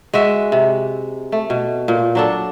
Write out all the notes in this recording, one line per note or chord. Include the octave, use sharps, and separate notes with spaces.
G#3 F#4 E5
C3
A3
B2
A#2
F#3 D4 A4